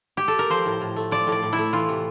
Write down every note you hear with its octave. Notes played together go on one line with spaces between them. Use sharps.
G4
A4
A#4
F3 C5
A2
A2
A3
F3 D5
A2
D5
A2
E4
A3
E3 F4
C3